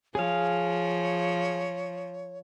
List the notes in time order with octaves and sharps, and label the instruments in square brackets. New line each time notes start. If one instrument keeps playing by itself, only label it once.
[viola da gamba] F3 [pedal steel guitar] G#4 F5 [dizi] C#5